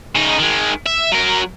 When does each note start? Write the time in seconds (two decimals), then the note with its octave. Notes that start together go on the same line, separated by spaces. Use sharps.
0.15 C#3 D#4
0.39 D#3 G#3
0.86 E5
1.12 F#3 A#4